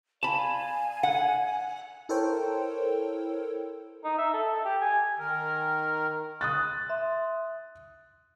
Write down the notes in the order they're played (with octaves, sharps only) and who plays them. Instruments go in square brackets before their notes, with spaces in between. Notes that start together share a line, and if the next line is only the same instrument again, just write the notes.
[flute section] D5 F5 G#5 [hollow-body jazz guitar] A5 B5
[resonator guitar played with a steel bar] F#5
[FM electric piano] E4 A4 A#4 C5 C#5 G5
[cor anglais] D#4
E5
A4
G4
G#5
[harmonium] D#3 A#4
[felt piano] D#6 F#6 A6
[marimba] E5 C6